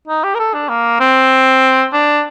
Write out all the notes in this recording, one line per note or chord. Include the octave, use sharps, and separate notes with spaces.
D#4
G4
A#4
A4
D4
A#3
C4
D4